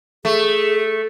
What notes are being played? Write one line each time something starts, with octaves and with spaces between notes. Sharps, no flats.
A3 G#4